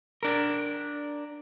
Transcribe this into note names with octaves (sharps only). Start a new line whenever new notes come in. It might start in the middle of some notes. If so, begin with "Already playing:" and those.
D4 A#4